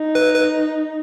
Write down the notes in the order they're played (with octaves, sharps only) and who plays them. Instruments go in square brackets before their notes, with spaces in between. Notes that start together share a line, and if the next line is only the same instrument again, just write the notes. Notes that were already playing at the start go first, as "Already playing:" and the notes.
Already playing: [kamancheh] D#4
[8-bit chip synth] B4
B4